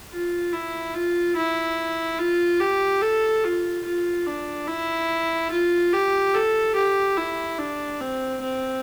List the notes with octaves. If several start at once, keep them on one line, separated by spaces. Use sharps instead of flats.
F4
E4
F4
E4
F4
G4
A4
F4
F4
D4
E4
F4
G4
A4
G4
E4
D4
C4
C4